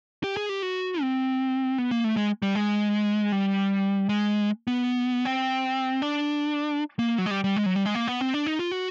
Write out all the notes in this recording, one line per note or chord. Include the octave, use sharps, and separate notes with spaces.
G4
G#4
G4
F#4
C4
B3
A#3
A3
G#3
G3
G#3
G3
G#3
B3
C4
D4
A#3
F#3
G#3
G3
G3
G#3
F#3
G3
G#3
A#3
B3
C4
D4
D#4
F4
F#4